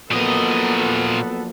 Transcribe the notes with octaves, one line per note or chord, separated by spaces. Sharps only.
A#2 F3 F#3 A#3 B3 A4 D#5